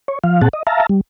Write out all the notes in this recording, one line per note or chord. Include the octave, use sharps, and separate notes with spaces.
C#5
F3 F5
A#2 C4 G#4 F#5 A5
D#5
E5 F5 A5 A#5
G3